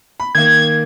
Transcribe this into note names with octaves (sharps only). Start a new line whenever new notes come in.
B5
D#3 A#3 G#6